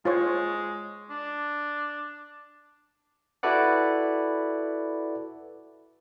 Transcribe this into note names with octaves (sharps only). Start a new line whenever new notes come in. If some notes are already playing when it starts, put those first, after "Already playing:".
G#3 F4 C5 C#5
D4
E4 F#4 A4 B4 D5 F#5